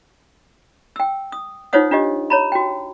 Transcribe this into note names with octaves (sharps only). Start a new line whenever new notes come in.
G5 E6
D#6
D#4 F4 C5 C#5 F#5 D#6
D4 F4 G4 D#5
C#5 A#5 B5
F#4 G5